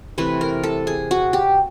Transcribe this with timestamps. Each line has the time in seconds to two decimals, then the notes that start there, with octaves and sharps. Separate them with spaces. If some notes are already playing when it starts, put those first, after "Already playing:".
0.18 C3 E3 A3 B4
0.41 A#4
0.63 A4
0.87 G#4
1.11 F#4
1.33 G4